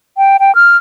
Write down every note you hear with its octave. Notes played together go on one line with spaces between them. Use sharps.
G5
G5
F6